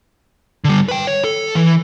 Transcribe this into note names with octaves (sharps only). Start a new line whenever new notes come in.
D3 G3
B4 G5
C#5
A4
E3